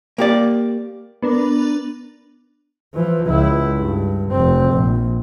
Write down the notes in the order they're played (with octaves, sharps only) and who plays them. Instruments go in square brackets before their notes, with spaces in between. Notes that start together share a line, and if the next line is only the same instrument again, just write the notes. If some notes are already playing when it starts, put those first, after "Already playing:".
[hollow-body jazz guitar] A#3 G4 D5
[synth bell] B3 D4 A#4
[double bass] E3 F3
C#2 E4
G2
F1 C4
A#1